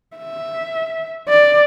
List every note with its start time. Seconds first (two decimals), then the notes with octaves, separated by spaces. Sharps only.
0.17 E5
1.29 D5